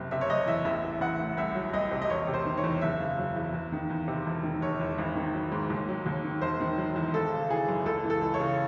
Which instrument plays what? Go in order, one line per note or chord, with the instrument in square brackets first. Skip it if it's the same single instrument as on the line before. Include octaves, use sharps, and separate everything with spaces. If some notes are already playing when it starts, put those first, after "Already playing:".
Already playing: [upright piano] F#1 C3
C3 E5
C#5
F#1 D#5
E2 E5
A1 E5
E3
A1 F#5
A2
C2 E5
F#3
C2 D#5
C3
D#5
E1 C#5
C3
C5
D#3
C#5
E2
F#1 E5
C#3
F#3
E2
E2
D#3
E2
C3
E1
D#3
E1 C#5
E2
G#1
D#3
F#3
G#2
D#2
F#3
D#2
D#3
E1 C5
D#3
F#3
E2
G#1 A4
C#3
E3 G#4
F#2
C#2 A4
E3
A4
C#2
C#5
C#3